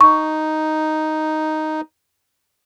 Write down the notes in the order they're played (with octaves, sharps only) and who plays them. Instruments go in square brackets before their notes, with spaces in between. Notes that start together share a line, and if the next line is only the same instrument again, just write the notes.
[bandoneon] D#4 [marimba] C#6